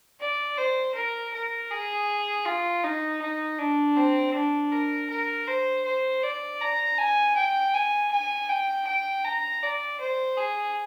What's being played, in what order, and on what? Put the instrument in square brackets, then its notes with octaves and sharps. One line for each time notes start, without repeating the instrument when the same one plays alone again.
[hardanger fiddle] D5
C5
A#4
A#4
G#4
F4
D#4
D#4
D4
C4
D4
A#4
A#4
C5
C5
D5
A#5
G#5
G5
G#5
G#5
G5
G5
A#5
D5
C5
G#4